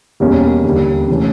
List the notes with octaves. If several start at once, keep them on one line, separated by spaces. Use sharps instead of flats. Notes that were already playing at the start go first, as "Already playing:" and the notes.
E2 B2 G3 A#3 C#4
D#2 D3 G3
C3 E3 A3 C#4